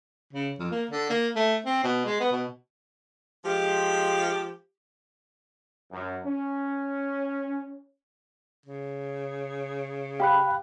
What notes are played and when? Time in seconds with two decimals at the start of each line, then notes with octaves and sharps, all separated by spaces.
0.33 C#3
0.59 F2
0.71 A#3
0.91 D3
1.10 A#3
1.36 A3
1.65 C4
1.84 B2
2.06 G#3
2.20 B3
2.32 B2
3.44 F3 G#3 F4 G4
5.92 F#2
6.24 C#4
8.66 C#3
10.20 G4 F5 B5 F#6